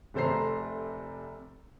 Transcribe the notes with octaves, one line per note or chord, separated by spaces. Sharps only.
F1 C3 A4 C5 A#5 C7